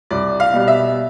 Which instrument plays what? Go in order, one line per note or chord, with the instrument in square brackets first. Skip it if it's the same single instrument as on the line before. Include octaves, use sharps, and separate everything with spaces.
[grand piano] C2 D5
F5
B2 G3
E5